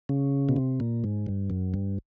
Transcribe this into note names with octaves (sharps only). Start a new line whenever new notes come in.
C#3
B2
C3
A#2
G#2
G2
F#2
G2